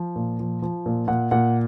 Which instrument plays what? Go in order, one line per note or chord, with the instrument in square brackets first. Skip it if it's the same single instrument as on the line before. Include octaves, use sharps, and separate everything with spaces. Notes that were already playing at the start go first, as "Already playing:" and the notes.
Already playing: [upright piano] F3
A#2
F3
F3
A#2
A#2 F#5
A#2 F#5